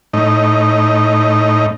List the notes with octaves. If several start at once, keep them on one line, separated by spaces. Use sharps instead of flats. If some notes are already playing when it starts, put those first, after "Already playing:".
A2 D#4